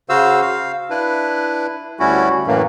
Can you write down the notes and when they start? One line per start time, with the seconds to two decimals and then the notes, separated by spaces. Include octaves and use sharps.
0.09 C#3 F#4 C5 F5 E6
0.42 F5
0.90 D4 E4 B4
2.00 D2 G3 C#4 E4 F#4
2.47 F#2 A2 E3 A#3